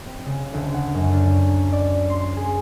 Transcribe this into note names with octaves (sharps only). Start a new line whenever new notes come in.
C4
C#3
D2
F#5
F#2
D4
D5
C6
G#4